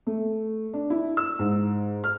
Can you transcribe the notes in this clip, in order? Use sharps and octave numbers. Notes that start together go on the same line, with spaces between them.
A3
D4
E4
E6
G#2
F6